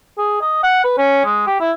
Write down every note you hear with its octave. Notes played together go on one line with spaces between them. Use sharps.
G#4
D#5
F#5
B4
C#4
G#3
G4
E4